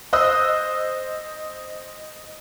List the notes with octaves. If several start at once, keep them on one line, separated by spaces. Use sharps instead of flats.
C5 D#5 D#6 E6 F#6